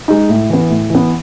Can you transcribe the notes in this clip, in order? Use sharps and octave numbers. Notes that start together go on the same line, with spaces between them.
G#3 D#4
A2
E3 B3
A2
E3 B3